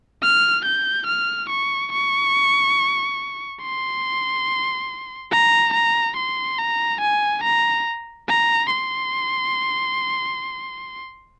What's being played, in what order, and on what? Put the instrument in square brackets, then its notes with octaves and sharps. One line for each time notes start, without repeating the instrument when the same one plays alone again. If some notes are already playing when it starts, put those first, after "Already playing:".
[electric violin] F6
G6
F6
C#6
C#6
C6
A#5
A#5
C6
A#5
G#5
A#5
A#5
C6